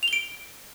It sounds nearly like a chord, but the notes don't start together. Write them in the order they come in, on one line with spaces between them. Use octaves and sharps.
F7 G7 D7